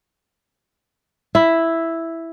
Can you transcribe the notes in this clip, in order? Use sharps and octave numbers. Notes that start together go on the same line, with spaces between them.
E4